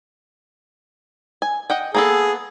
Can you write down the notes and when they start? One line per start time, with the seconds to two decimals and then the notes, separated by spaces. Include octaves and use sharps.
1.42 G#5
1.70 D#5 F#5 G5
1.94 A#3 B3 G#4 A4